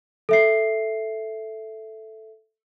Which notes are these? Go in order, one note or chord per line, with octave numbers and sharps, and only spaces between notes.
A4 E5 C7